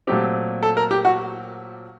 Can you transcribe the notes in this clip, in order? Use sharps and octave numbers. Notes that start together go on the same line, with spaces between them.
A#2 F#3 A3 C4 G4
A4
A#4
G4
F#4